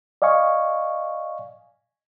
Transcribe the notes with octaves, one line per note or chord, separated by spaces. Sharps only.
D5 D#5 F5 G#5 C#6